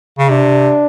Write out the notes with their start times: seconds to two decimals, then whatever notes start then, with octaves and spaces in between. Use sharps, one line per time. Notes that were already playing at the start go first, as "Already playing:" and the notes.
0.18 C#3
0.29 C3 D4